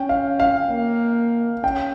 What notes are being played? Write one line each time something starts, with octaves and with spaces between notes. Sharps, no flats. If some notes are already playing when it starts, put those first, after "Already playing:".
Already playing: C#4 G5
F5
F5
A#3
C#4 G5